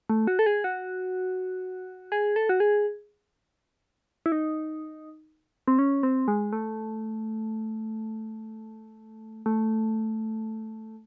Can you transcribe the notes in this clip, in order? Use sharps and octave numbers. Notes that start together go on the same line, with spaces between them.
A3
F#4
A4
G#4
F#4
G#4
A4
F#4
G#4
E4
D#4
C4
C#4
C4
G#3
A3
A3